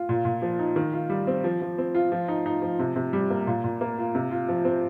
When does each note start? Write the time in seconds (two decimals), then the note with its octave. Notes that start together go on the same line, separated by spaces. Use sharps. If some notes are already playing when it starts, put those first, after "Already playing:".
Already playing: F4
0.09 A#2
0.25 A#2
0.42 F3
0.59 D#4
0.76 D#3
0.93 F4
1.10 G3
1.27 C4
1.44 F3
1.61 F3
1.78 C4
1.95 F4
2.12 F3
2.28 D#4
2.46 D#4
2.62 F3
2.79 C3
2.96 C3
3.13 G3
3.30 A#3
3.47 A#2
3.64 A#2
3.81 A#3
3.98 F4
4.15 C3
4.31 F4
4.48 F3
4.65 C4